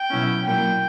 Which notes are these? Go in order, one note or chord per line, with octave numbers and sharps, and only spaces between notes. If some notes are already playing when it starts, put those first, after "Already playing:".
Already playing: G5
B2 F#3 C#4 E4
A#2 F#3 A#3 E4 G5